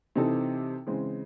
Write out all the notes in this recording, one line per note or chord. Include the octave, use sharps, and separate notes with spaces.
C3 E3 C4 D#4 A4
C#3 E3 G#3 C4